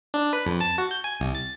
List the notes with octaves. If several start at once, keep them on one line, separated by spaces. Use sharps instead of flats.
D4
B4
F2
A5
F#4
G6
G#5
C2
A6